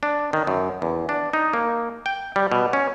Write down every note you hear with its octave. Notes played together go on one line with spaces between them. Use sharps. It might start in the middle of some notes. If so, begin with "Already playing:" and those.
D4
D#3
F#2
E2
D4
D#4
A#3
G5
G3
B2
C#4